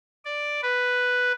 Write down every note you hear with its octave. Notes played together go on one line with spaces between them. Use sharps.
D5
B4